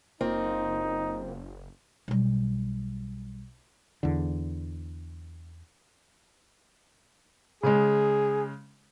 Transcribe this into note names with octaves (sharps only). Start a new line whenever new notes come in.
F#1 A#3 C4 D#4 F4
B1 G3
E2 D3
C#3 G#3 G#4